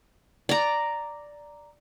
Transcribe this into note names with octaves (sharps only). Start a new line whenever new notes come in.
D5 A#5